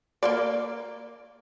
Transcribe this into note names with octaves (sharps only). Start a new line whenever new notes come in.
A#3 A#4 D5